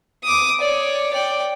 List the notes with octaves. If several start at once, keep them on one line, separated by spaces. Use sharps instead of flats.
D6 D#6
C#5 D5
D5 G5